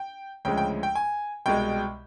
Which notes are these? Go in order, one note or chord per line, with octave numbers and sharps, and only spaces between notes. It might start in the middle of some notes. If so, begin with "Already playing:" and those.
Already playing: G5
D2 C#3 F3 G#3 G5
G5
G5
G#5
C2 B2 G#3 G5